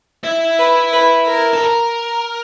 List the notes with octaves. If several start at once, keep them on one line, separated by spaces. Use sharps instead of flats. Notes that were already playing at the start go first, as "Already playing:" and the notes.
E4
B4
B4
A#4
A4
A#4